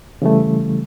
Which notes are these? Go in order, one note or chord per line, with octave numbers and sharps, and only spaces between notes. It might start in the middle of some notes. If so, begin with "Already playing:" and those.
C#3 E3 G3 A3